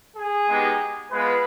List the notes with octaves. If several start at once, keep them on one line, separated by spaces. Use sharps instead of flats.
G#4
G#3 B3 D#4 G4
G#3 B3 F4 B4